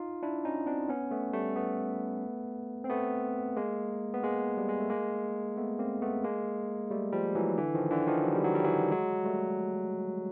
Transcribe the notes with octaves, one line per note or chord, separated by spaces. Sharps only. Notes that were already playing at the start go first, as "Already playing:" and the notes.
Already playing: D#4 F4
D4 E4
C#4 D#4
C4 D4
B3 C#4
A3 B3
G3 A3
A3 B3
C4
A3 B3
G#3 A#3
B3
G#3 A#3
G3
G#3
A3
G#3 A#3
A3 B3
A#3 C4
A3 B3
G#3 A#3
G3 A3
F3 G3
E3 F#3
D3 E3
D#3 F3
D3 E3
D#3 F3
F#3
G3
F#3
G3
E3 F#3
F#3 G#3
G3 A3